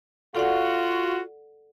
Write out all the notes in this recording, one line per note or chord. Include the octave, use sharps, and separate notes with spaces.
F4 F#4 A4 D5 F#5